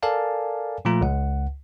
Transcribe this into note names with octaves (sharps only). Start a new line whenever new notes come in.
A4 A#4 D5 F5 G#5 A5
A#2 F3 A3 F4 A#5
C#2 F#5